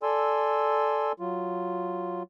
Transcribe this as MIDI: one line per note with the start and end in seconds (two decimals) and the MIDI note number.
0.03 1.12 69
0.03 1.12 74
0.03 1.12 80
0.03 1.12 84
0.03 1.12 88
1.20 2.23 54
1.20 2.23 65